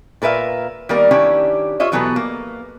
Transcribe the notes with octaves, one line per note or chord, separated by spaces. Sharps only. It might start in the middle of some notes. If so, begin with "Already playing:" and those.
A#2 A#4 B4 E5 F5
D#3 G3 A#3 A#4
D#3 C#4 D4 E4 G4
F4 C#5 D#5 E5
B2 E3 F#3 B3 A4 B4
A#3